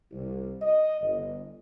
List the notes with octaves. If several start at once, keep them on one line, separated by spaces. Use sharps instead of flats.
C2
D#5
G1